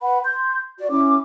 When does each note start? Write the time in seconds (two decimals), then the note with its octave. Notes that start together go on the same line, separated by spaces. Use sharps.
0.02 B4 F#5 B5
0.25 C6 G6
0.79 F#4 D5
0.91 C#4 E4 D6